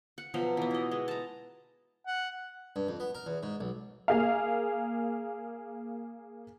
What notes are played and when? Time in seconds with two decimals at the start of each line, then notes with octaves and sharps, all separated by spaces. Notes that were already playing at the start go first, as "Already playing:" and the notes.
0.18 F#5
0.34 B2 F3 F#3
0.57 E3 B3
0.71 E4 D#5
0.91 G#3
1.08 A5 A#5
2.07 F#5
2.76 G2
2.88 F2
3.00 B3
3.15 A#4
3.26 E2
3.43 G#2
3.61 B1
4.08 A#3 G#4 F5